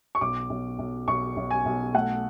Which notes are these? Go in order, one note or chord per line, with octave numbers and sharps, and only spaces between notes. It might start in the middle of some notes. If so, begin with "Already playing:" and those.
C#6
B1 D6
B1
B1
B1 C#6
B1
G#5
B1
A3 F#5